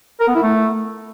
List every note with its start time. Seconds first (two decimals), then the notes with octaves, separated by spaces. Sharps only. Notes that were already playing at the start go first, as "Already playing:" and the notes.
0.20 A#4
0.28 B3
0.35 E4
0.43 A3